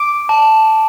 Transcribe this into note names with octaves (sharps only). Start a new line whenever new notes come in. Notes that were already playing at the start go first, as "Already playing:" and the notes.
Already playing: D6 D7
A5